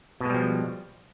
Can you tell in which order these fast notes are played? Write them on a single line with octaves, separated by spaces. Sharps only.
B2 G#3 G3 F3